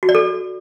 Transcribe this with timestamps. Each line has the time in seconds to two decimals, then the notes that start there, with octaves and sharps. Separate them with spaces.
0.03 F#4
0.09 D5
0.15 A4